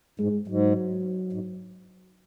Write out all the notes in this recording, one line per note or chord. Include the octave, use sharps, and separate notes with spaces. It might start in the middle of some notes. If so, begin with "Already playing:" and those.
G#2 G#3
G#2 F#3
G#2